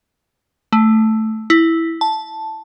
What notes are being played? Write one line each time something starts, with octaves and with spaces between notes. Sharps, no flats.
A3
E4
A5